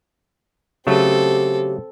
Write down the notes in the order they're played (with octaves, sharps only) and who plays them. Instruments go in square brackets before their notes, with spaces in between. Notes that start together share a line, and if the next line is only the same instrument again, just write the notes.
[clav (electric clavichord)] C#3 F#3 A3 [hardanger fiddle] C4 A4 [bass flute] G4